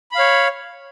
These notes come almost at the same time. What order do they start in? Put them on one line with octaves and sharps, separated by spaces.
B5 F5 C#5